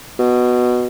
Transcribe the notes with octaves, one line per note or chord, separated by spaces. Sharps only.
B2